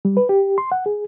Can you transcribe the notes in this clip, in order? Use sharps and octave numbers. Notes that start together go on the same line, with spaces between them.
G3
B4
G4
C6
F#5
G#4